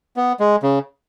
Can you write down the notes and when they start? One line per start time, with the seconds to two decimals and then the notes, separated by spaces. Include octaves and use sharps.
0.16 B3
0.40 G#3
0.63 C#3